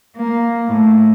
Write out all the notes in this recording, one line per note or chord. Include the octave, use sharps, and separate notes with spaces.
A#3
A2